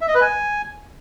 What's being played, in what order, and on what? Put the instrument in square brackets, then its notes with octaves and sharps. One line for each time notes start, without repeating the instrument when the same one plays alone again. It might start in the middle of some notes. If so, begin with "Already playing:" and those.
[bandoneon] E5
D#5
B4
G#5